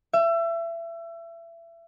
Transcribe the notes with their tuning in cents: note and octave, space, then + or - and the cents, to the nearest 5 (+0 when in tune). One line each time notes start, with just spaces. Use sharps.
E5 +30